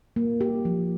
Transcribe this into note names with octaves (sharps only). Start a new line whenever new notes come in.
A#3
G4
F3